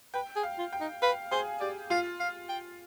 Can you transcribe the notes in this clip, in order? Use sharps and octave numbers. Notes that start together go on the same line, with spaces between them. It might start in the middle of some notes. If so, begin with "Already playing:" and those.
B4 G5
G#4
F5
F4
G5
D#4
B4 F5
G#4 C5
G4 D5
F4 F5
F5
G5